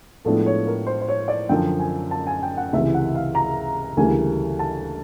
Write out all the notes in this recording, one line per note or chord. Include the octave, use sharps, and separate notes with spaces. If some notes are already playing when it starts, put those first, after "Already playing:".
A2 F3 G#3 B3 D4 A4
C#5
A#4
C5
C5
C#5
D5
F#2 D3 F3 G5
G#5
A5
G#5
G5
F#5
C#2 C3 E3 E5
F#5
F5
A#5
D2 C#3 E3 G3 A#3 G#5
A5